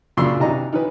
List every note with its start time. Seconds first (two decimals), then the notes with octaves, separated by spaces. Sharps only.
0.17 F#2 A#2 C#3 D4 C6 E6
0.40 C3 D#3 E3 D4 D#5 A#5
0.73 D#3 E3 B4